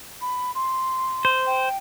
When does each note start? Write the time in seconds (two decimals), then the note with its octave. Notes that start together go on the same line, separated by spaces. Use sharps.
0.21 B5
0.55 C6
1.25 C5
1.46 G5